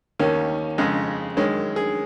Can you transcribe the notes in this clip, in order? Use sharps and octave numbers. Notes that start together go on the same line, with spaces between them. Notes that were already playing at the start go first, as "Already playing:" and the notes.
D#2 D#3 A#3 C#4
F2 C#3 G#3
F#2 D#3 G#3 C#4
G#4